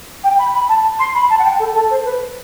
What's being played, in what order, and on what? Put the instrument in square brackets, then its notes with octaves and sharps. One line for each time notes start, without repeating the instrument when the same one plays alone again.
[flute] G5
B5
B5
A5
C6
B5
A5
F#5
G5
A4
A4
C5
B4